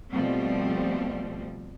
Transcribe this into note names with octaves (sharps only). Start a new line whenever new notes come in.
B2 F3 G3 A3 C4